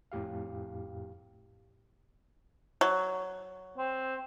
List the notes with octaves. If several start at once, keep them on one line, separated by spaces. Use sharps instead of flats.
F2 A2 G4 F5
F#3
C4